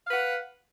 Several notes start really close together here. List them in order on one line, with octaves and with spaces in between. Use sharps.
F5 B4 F#5